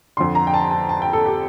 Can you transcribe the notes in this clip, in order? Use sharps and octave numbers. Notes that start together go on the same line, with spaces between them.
F2 D3 C6
A#5
G5
A5
A5
A5
G5
A4
G4